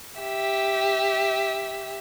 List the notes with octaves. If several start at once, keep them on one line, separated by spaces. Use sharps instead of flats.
G4 E5